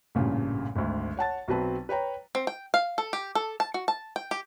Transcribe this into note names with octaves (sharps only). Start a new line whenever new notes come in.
A1 G2 A#2 C#3
G#1 D2
C#5 F#5 A5 A6
B1 F#3 C4 B4 A5
B4 C#5 G5 A#5
C4
G5
F5
A4
G4
A4
A5
F#4
A5
G5
G4